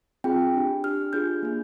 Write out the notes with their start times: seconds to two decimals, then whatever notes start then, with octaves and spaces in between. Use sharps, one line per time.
0.24 C4 F4 G#4 G5
0.54 D4 G4
0.84 D4 G4 F6
1.13 D4 F4 G#4 G6
1.43 A#3 D4 G#4